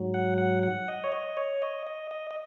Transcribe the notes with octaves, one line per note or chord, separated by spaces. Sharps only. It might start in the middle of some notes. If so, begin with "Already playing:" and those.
Already playing: G#2 F#3
F#5
F#5
F#5
D#5
C#5
D#5
C#5
D#5
D#5
D#5
D#5